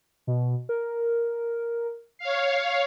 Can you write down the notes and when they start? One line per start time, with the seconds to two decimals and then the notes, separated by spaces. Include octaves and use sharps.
0.27 B2
0.69 A#4
2.19 C#5 F5 C7